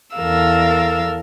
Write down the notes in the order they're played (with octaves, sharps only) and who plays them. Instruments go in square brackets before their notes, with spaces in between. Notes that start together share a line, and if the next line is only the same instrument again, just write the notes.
[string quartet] E2 A4 A#4 F5 E6